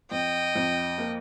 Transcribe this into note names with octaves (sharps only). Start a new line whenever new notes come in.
F2 D#5 G5
F2
A#3